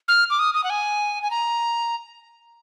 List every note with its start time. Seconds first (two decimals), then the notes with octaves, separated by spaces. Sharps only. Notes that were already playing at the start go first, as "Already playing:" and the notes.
0.08 F6
0.30 D6
0.39 D#6
0.54 D#6
0.64 F#5
0.70 G#5
1.23 G#5
1.31 A#5